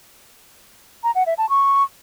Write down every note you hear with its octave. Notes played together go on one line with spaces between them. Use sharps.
A#5
F#5
E5
A5
C#6